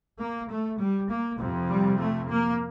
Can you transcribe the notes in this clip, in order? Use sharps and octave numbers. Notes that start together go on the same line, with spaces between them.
A#3
A3
G3
A#3
F2 C3
G3
A3
A#3